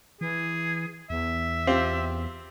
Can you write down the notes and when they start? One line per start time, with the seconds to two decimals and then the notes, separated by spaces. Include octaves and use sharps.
0.21 E3 G#4
1.10 E2 E5
1.67 C4 F4 G4